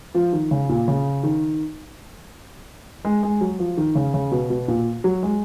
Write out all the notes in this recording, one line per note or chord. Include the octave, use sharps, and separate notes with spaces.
F3
D#3
C#3
A#2
C#3
D#3
G#3
G#3
F#3
F3
D#3
C#3
C#3
B2
B2
A#2
F#3
G#3